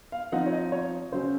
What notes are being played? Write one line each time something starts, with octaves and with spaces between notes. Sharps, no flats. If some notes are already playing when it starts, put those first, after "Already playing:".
F5
F3 C4 D#4 F#5
C#5
D#5
C#5
C#3 F#3 C#4 C5